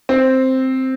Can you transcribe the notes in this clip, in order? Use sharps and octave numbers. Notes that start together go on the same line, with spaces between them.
C4